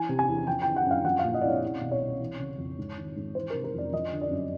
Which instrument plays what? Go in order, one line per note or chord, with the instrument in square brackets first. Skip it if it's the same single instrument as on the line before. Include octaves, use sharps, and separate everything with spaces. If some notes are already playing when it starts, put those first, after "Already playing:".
Already playing: [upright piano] E3 G#5
C3
G#5
E2
F3 G5
D3 G5
F#5
F#2 F5
F3 F#5
F5
A#2
D#5
C2 D5
C#5
C2
B2
C#5
C2
E3
C#3
F2
G#2
D#3
G#2
E3 C5
C3 A#4
A#4
F2 D5
F3 D#5
D3
D5
F#2